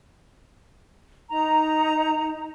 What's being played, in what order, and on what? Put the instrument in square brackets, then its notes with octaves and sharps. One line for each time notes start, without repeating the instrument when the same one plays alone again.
[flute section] D#4 A#5